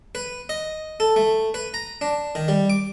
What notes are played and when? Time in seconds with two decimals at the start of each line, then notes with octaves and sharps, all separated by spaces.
0.15 B4
0.49 D#5
1.00 A4
1.16 A3
1.54 B4
1.74 A#5
2.01 D4
2.35 D#3
2.48 G3
2.70 D6